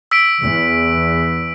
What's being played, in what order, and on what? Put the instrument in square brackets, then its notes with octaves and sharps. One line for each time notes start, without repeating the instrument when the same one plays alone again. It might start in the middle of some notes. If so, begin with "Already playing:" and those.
[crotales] E6 B6 D7
[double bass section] E2